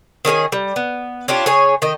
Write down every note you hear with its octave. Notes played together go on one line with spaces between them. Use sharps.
D#3 C#4 G#4 G#5
G3
B3
C#4 D4 F4 G4
C#3 G#4 C#5
D#3 D#5